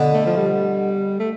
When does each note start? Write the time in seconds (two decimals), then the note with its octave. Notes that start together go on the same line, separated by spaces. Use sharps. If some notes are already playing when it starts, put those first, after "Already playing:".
Already playing: B2 D3
0.13 A3
0.26 F3
0.37 G3
1.19 A3